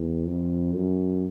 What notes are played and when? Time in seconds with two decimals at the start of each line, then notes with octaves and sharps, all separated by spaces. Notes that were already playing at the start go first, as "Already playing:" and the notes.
Already playing: E2
0.26 F2
0.75 F#2